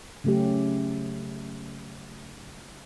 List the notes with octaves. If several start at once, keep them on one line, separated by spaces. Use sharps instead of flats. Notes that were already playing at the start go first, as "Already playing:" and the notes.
C#3 F#3 A3 C#4 G4